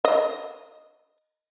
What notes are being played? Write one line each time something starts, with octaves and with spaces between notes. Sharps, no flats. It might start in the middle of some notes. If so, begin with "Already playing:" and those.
D#5